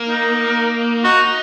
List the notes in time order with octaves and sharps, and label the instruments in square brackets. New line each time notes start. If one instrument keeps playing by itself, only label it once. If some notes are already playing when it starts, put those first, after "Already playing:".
Already playing: [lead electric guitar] A#3
[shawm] D#4
[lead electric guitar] D#4 [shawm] F#4